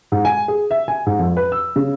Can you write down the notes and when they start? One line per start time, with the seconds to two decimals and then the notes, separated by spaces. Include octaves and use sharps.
0.12 G#2
0.25 G#5
0.48 G#4
0.71 E5
0.88 G#5
1.06 G#2
1.19 F2
1.37 B4
1.52 E6
1.76 C#3